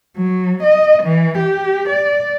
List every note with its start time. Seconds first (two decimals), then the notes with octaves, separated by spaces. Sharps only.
0.17 F#3
0.63 D#5
1.03 E3
1.38 G4
1.89 D5